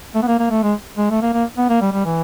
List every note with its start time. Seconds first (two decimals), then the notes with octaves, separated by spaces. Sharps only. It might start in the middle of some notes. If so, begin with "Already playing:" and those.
0.15 A3
0.23 B3
0.27 A#3
0.39 A#3
0.50 A3
0.63 G#3
0.97 G#3
1.10 A3
1.22 A#3
1.33 A#3
1.57 B3
1.69 A#3
1.81 G3
1.92 G3
2.05 E3